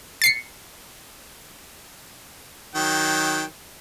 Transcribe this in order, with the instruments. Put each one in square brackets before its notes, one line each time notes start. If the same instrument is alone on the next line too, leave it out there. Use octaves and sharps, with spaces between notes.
[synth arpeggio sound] A6 C7 C#7
[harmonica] D#3 F#3 G5